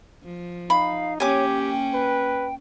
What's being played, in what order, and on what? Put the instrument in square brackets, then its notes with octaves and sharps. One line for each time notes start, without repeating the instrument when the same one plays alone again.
[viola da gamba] F3
[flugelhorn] D#4 [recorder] F5 [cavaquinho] B5
[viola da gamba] A#3 C#4 [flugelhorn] G4 [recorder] C#5 [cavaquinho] G#5 D6
[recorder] G5
[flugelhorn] B4